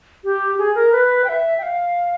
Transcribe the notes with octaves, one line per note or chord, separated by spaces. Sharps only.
G4
G#4
A#4
B4
G5
E5
G5
F5